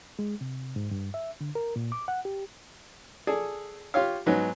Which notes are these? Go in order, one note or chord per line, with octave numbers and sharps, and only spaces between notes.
G#3
C3
G#2
G2
E5
D3
A#4
A#2
D6
F#5
G4
G#4 A4 D5
F4 G4 C#5 F5
G#2 F#3 B3 D#4